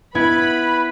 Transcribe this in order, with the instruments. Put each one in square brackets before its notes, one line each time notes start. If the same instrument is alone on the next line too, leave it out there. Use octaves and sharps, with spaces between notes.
[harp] B3 E4 G#6 [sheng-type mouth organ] B4 [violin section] B5